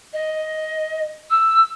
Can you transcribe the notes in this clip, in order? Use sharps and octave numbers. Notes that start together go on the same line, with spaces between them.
D#5
E6